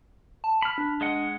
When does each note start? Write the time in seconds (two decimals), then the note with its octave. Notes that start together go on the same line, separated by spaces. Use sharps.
0.44 A5
0.62 B5 F6
0.78 D4
1.01 G#3 D#5 F#5